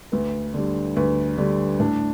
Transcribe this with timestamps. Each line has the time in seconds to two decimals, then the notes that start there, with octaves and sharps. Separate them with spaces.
0.12 D2 B4
0.54 D3 G3
0.96 D2 B4
1.38 D3 G3
1.79 A2 D4